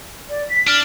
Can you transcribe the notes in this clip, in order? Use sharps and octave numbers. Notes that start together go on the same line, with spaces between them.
D5
B6
D4 F6